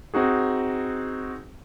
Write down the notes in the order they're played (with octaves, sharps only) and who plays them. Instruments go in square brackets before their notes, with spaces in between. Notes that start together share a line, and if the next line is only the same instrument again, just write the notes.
[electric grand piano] C4 D#4 F#4 G#4